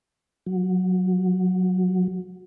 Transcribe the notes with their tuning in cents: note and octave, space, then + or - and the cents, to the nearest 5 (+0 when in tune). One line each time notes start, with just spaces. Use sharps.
F#3 -10